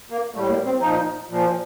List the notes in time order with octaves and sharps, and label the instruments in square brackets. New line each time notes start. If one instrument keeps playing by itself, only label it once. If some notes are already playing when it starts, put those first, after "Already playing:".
[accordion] A#3
A2 G3 A3
A#3
C4
A#2 F3 D#4
A#2 F3